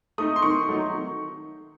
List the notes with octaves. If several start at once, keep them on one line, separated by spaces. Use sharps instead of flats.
A3 D#4 D#6
C6
D#3 C#6
F#3 A3 D#4
D#3